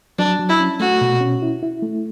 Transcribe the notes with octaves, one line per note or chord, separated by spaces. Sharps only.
F#3 D4
F#3
E4
C#4
A3 F#4
B2
C#4
E4
E4
A3